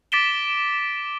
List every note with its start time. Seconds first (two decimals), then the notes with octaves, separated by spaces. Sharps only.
0.12 D6 A6 B6 D7 E7 G7